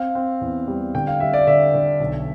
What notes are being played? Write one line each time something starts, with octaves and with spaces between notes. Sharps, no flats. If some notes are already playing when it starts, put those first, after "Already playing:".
Already playing: C4 F5
C4
E2
G3
D3 G5
F5
G3 E5
D5
D3 E5
D3
B1